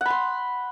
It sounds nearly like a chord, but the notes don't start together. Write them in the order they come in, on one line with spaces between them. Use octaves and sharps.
F#5 B5 C6